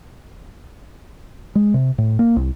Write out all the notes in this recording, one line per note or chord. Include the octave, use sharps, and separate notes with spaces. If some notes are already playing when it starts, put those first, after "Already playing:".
G#3
C3
A2
A#3
C2